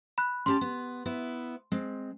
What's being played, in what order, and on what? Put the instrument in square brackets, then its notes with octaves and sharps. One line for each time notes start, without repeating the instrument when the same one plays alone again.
[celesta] B5 F#6
[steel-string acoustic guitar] C#4 G4 A5 [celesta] C6
[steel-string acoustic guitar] B3
B3 E4
G#3 C4